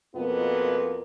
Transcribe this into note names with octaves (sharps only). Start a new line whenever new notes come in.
F2 B2 A#3 B3 F4